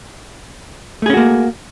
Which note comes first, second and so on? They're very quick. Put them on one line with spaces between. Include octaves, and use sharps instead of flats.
A3 G#4 C#4 F#4 A#3